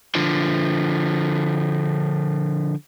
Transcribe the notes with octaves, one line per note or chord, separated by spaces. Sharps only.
D3 F3